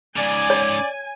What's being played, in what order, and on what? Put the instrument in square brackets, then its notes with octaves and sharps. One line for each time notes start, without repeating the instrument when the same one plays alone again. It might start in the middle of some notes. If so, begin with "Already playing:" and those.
[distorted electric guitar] G#2 C#3 [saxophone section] D5 [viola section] G#5
[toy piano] C#5